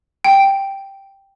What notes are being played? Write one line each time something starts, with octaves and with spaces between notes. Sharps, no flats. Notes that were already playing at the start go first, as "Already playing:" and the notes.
G5